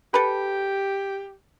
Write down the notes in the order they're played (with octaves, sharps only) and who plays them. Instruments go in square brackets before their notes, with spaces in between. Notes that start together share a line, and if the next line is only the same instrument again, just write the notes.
[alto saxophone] G4 [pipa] A4 B4